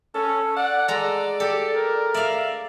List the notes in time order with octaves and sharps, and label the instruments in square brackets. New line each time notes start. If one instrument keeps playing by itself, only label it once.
[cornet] C#4 [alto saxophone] A4
[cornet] D5 [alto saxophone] F#5
[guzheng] G#3 A#5 [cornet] A4 [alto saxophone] D5
[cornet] G4 [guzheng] A4
[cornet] A#4
[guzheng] D5 F5 [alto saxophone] E5